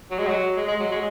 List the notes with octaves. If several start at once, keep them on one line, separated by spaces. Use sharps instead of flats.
F#3
G#3
F#3
G#3
G#3
F#3
G#3